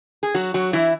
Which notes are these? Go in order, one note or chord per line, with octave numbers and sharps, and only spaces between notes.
G#4
F#3 F#4
F#3 F#4
E3 E4